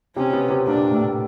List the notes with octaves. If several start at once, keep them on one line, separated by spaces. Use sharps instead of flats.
C3 C4 C#4
B2 B3
C3 C4
A#2 A#3 D4
A2 A3